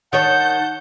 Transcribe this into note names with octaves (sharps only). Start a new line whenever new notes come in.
D#3 C#5 F#5 A5 G6